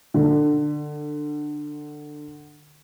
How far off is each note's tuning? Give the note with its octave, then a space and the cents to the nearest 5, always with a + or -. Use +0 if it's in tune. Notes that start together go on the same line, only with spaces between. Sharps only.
D3 +20